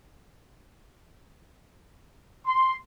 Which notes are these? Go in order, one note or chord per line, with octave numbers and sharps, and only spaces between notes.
C6